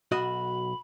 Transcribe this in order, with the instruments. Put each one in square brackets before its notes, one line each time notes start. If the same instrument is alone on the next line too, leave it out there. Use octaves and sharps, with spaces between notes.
[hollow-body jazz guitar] B1 F#4 D#5 [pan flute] B5